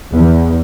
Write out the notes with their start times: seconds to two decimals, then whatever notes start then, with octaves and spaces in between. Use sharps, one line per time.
0.14 E2